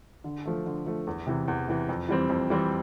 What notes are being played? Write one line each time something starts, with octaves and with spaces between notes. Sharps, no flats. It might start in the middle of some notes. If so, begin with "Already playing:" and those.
D3
F3 A3
D3
F3 A3
E2
C3 E3
E2
C3 E3
F2
E3 G3 C4
F2
E3 G3 C4